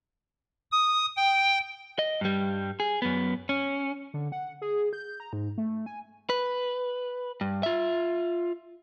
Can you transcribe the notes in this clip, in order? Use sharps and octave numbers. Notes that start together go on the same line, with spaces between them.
D#6
G5
D#5
G2 G3
G#4
F#2 B3
C#4
D3
F#5
G#4
G6
A#5
G#2
A3
G#5
B4
G2
F4 E5